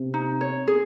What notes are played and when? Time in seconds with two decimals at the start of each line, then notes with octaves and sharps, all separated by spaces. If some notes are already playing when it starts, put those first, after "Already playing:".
Already playing: C3
0.14 D#4
0.41 C#5
0.68 G#4